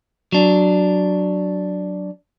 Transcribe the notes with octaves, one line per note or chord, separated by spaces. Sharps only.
F#3 D4